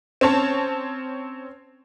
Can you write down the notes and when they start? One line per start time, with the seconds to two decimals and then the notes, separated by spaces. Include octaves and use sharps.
0.21 C4 C#4 C#5 A5